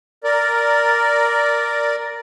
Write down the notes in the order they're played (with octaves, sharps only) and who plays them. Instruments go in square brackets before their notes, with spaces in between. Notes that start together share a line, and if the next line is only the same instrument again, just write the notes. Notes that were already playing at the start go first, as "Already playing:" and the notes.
[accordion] A#4 D5